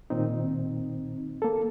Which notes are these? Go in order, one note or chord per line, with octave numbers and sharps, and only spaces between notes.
A#2 D#3 C4 D#4
A#3 A4